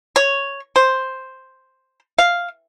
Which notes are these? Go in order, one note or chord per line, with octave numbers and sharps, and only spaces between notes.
C#5
C5
F5